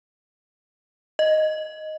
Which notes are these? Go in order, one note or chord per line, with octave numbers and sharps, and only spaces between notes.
D#5